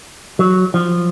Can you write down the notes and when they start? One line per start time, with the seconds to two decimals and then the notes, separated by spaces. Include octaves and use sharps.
0.39 F#3
0.74 F3